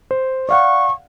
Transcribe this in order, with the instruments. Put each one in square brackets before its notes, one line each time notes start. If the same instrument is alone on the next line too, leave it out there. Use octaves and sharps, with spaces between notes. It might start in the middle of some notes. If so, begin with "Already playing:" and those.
[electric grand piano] C5
[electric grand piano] D5 F5 F#5 [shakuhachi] C#6